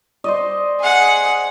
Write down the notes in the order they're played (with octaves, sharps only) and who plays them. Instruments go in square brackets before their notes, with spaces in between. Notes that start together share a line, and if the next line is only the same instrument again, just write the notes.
[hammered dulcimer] C5 D5 D#5
[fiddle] G#4 F#5